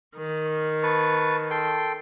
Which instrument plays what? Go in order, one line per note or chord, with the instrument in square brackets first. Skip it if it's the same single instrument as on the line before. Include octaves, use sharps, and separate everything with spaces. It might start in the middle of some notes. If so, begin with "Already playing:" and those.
[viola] D#3
[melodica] B4 A5 C#6
A4 G5 C6